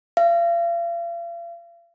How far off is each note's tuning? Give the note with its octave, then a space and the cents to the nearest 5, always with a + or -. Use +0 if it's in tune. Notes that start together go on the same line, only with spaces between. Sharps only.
F5 -40